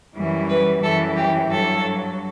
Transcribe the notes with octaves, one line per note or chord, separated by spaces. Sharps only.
F#2 E3 G3
B4
F#2 E3 G3 A4
G4
G2 F#3 A4